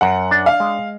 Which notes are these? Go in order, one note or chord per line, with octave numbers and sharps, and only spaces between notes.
F#2 F#5
D4
F5
G#3